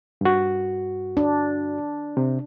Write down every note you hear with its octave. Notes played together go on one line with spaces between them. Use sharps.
G2 F#4
D4
C3